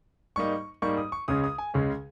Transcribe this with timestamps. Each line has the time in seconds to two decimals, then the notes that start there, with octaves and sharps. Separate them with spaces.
0.36 G#2 G3 A#3 D#4 C#6
0.82 G#2 G3 A#3 D#4 C#6
0.97 D#6
1.12 C#6
1.28 C#2 C#3 G#3 C#4 D#6
1.44 D#6
1.58 G#5
1.74 C#2 C#3 G#3 C#4